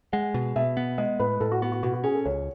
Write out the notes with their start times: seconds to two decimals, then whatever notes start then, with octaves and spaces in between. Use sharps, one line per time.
0.13 G#3 F#5
0.34 B2
0.56 B2 E5
0.77 B3
0.98 G#3 D#5
1.19 A2 B4
1.40 A2 A4
1.52 F#4
1.62 B3 F#4
1.72 F#4
1.83 B2 F#4
1.93 F#4
2.04 C#4 G#4
2.15 A4
2.25 C#2 C#5